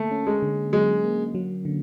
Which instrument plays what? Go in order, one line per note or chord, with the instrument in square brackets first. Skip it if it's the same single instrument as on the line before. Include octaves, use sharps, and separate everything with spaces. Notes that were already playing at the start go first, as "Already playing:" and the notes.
Already playing: [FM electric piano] D3 A#3 [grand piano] A3
[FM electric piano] C#4
[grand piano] G#3
[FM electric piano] D3
[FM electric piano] F#3 [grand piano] G#3
[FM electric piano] A#3
F#3
D3